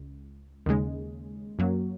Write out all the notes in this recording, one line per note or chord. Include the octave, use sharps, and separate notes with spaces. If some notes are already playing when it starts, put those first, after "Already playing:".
Already playing: C#2
D#2 C#3 G#3
F#2 F#3 A#3